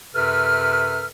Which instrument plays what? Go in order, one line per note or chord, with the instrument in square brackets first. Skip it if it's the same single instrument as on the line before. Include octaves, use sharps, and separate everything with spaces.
[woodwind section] F#2 C3 A4 B4 F6